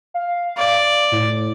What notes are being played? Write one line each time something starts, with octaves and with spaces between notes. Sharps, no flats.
F5
D5
A2